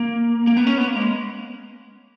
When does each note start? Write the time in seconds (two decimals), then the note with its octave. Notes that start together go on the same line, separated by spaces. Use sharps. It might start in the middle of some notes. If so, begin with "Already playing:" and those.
Already playing: A#3
0.47 A#3
0.57 B3
0.67 C#4
0.78 B3
0.87 A#3
0.96 G#3